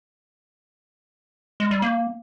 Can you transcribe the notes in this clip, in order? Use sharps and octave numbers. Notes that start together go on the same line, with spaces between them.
G#3
G3
A#3